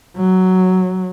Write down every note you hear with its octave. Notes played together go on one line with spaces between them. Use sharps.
F#3